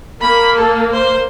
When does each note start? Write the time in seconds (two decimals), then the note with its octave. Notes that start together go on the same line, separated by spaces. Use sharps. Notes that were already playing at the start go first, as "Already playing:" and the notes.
0.21 A#3 B5
0.57 A4
0.92 C5